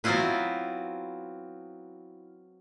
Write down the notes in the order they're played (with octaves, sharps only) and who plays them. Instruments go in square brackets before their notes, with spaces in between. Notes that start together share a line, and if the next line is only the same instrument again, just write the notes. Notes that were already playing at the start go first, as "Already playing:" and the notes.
[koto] F#3 B3 C4 E4 F4 B4